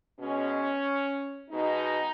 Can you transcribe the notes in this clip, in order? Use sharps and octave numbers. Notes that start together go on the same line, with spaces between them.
B2 G#3 C#4
B2 G#3 D#4